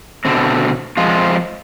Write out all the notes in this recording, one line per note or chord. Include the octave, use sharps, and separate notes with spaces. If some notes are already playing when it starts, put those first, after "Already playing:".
B2 D3 C4
F3 G#3 C4 F4